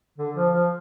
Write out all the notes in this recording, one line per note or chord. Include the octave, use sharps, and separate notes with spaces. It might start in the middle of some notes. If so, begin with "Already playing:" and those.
D3
F3
F3